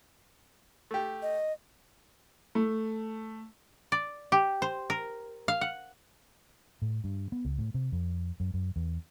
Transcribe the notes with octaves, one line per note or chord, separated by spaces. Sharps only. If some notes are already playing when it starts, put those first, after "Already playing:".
A3 G4
D#5
A3
D5
G4
C5
A#4
F5
F#5
A2
G2
B3
C#2
A2
C3
F2
F#2
F#2
E2